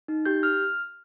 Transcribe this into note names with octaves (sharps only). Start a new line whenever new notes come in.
D#4
G4 G6
F6